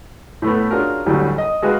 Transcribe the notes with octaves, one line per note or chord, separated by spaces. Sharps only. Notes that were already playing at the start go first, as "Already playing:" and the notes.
A2 A3 B3
C#4 D4 F4 F#4 G#4 A#4
A1 D2 A2 F#3 G3
D#5
G#3 F#4 G#4 B4 F5